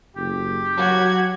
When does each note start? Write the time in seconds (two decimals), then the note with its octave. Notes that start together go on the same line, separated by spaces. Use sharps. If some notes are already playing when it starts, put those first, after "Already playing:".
0.16 F#1 G4
0.77 F#3 F#4 G#6